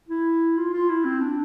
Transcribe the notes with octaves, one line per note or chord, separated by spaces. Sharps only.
E4
F4
F4
E4
C4
D4